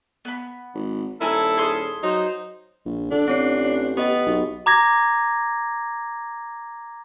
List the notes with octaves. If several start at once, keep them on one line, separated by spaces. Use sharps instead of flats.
B3 B5
G#1
D#1 E4 F4 A4 G#5 A#5
G#4 C6 F6
F#3 D#4 C5
A#1
D3 D4
A1 C4 C#5 C7
B3 G4 D#5
B1
A#5 D6 G#6 A#6